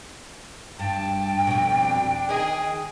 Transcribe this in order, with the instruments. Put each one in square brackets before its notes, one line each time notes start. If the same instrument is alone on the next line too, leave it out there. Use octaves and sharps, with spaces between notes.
[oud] G2 [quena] G5 [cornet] A5
[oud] F2 B2 [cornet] D4
[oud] D#3 D#5 [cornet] G#4